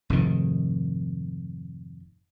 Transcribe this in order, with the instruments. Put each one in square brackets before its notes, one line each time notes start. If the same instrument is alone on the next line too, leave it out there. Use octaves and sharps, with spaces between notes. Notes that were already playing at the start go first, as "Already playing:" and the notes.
[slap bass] F1 G#2 D#3